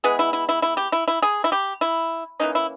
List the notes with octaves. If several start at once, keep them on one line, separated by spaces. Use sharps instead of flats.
E3 G#3 B3 G#4
E4
E4
E4
E4
G4
E4
E4
G#4
E4
G4
E4
E3 A#3 C#4 D#4
E4